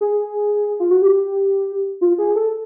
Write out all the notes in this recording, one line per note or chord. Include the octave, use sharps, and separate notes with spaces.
G#4
F4
F#4
G4
F4
G#4
A4